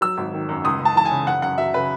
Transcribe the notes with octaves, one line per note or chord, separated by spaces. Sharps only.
F#3 E6
G#1
D#3
F#2
C#2 D#6
C#2
A5
E3 A5
G#5
C#3
F#2 F#5
F#2 F#5
F#3 E5
C#3 B4